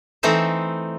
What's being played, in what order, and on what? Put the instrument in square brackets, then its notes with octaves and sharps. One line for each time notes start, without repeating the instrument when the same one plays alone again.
[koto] E3 A3 C4 D#4 C5 E5